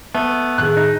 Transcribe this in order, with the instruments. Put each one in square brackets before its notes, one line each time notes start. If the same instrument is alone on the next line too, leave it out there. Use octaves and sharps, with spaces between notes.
[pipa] A3 [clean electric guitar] B3
[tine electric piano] A2 D#3 G#4 [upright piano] F#6
[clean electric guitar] D#4